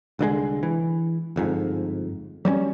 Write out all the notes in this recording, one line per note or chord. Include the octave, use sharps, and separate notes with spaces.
C2 D3 F#3 G#3
E3
G1 F2 G#2
F#3 G3 C4 C#4